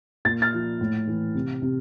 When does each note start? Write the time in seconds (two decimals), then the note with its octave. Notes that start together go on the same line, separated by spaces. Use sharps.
0.25 A#2 A6
0.42 F6 A6
0.53 F3
0.81 A2
1.07 E3
1.34 C3
1.62 C3